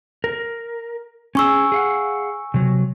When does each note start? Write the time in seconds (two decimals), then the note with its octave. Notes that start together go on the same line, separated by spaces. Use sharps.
0.24 A#4
1.35 C#4 G#4 G#5 C#6 E6
1.72 G#4 F5 F#5
2.54 C3 F#3